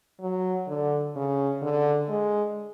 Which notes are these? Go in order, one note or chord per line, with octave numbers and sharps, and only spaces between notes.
F#3
D3
C#3
D3
G#3